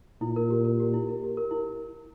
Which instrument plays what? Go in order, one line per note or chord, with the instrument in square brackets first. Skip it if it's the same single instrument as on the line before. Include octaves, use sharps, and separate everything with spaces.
[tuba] A#2 [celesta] E4
[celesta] A#4
G4
A#4
G4
E4
A#4
G4
A#4
E4